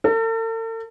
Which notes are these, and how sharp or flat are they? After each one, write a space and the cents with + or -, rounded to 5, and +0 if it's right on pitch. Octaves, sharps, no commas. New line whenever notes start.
A4 +45